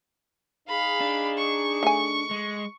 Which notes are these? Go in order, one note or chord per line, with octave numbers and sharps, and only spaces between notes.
D#4 G#4 F5 B5
D4
C#6
A3 G#5
G#3